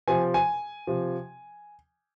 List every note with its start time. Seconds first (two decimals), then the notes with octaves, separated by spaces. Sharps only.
0.08 C3 F3 G#5
0.34 G#5
0.87 C3 F3